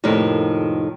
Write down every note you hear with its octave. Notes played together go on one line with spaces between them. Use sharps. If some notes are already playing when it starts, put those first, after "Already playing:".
F2 A2 C3 D#3 A#3